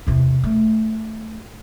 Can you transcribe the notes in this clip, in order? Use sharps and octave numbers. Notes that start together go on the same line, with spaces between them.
E2 C3
A3